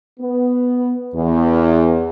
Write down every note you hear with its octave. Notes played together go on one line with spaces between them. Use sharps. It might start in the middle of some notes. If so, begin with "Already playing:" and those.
B3
E2